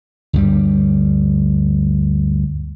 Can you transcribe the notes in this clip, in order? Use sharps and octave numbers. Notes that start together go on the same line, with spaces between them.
D2 G2 G3